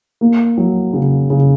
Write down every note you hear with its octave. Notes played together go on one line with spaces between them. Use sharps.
A#3
F#3
C#3
C#3